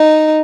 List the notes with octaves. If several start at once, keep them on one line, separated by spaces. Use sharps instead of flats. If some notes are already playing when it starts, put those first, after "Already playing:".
Already playing: D#4